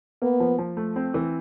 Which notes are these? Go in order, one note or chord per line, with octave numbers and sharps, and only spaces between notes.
A#3 B3
F3
F3
A3
C4
E3